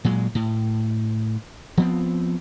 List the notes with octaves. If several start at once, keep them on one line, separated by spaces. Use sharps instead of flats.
A#2 F#3 G#3
A2
F3 B3 C4